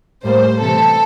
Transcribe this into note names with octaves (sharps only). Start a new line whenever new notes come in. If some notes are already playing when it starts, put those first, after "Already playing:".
A2 G3 A#3 C5
C3 E3 A3 A4